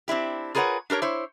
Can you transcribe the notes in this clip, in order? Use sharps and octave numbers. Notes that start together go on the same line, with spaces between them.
C4 D4 E4 G4
F4 G#4 A#4 B4 C#5 F#5
D4 G4 A#4 C#5
E4 C5 C#5